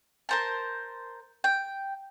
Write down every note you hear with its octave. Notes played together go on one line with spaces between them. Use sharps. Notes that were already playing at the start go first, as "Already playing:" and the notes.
A#4 C5 A5
G5